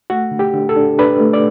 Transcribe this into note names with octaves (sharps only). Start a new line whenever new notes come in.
A3 F#4
D3
G4
D3
A4
D4
D4 B4
A3
D5